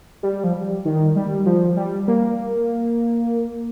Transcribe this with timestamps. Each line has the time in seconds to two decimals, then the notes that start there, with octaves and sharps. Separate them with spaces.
0.23 G3
0.44 F3
0.54 G3
0.85 D#3
1.16 G3
1.46 F3
1.77 G3
2.08 A#3